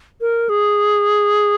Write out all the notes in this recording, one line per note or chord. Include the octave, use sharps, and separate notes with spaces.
A#4
G#4